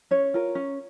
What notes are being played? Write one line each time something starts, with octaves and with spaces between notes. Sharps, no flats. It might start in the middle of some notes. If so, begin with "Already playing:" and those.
C#4 C#5
F4 A#4
C#4